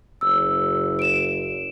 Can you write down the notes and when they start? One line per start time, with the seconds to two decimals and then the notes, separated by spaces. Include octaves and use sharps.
0.21 F#1 E6
0.99 D7 E7